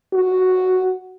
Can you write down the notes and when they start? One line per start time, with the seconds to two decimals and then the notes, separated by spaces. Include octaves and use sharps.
0.14 F#4